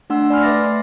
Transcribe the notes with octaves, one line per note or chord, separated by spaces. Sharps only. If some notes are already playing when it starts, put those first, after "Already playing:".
A3 D4 F#5 C6 E6
D5 G#5 B5 C6 F6
A3 B4 E5 D6 A6 A#6
C6